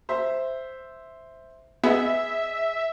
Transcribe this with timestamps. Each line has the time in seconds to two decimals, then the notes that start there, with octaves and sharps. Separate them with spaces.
0.09 C5 E5
1.84 B3 G#4 D#5 E5